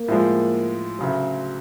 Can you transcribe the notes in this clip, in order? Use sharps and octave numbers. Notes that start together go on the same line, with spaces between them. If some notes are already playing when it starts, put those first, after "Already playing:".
Already playing: A#3
A2 F3 G#3
D2 C#3 F#3